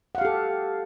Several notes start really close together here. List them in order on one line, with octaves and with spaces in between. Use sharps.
F#5 F5 G4 A4